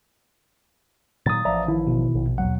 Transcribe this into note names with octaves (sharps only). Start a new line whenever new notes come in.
A#2 D#3 F#3 D#6 A6
A1 F3 D5 E5 A#5
D#3 E4
B2
A#1
D#2 B2 F#3 F#5